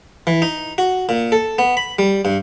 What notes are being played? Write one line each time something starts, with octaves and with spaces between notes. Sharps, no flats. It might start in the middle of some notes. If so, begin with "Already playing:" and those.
E3
D#4
F#4
A#2
A4
B3
B5
G3
G2